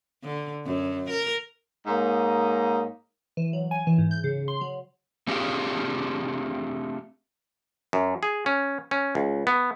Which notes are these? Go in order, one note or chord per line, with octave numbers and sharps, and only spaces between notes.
D3
F#2
A#4
G#2 A#3 C#5 D#5
E3
F#3
G#5
E3
G#2
G6
C#3
C6
F#3
A3 C4 D4 F4 G4 G#4
F#2
G#4
C#4
C#4
C#2
B3